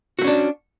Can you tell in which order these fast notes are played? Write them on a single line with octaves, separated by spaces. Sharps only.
F#4 A3 C#4 D4